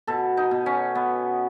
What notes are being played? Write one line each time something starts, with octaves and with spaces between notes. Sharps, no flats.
B2 A4
D#4
B2
C#4
B3